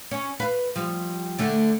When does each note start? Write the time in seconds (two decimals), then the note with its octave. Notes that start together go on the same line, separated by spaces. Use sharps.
0.11 C#4
0.40 B4 F5
0.76 F3 G3
1.38 D3 A3 D4